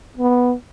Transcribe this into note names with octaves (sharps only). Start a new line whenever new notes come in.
B3